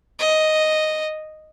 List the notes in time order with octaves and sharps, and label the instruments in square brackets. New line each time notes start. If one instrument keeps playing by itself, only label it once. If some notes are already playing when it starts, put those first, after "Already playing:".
[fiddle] D#5